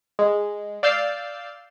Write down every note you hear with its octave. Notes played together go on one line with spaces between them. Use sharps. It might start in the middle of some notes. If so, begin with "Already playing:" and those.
G#3
D5 F5 E6 G6 A6 C7